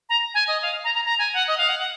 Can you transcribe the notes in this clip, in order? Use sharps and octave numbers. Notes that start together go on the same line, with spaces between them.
A#5
G#5
D#5
F5
A#5
A#5
A#5
G#5
F#5
D#5
F5
F#5
F#5